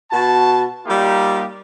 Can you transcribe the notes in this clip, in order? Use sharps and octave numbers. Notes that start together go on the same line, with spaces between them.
B2 F#4 A5
G3 A#3 D#4 F4 G4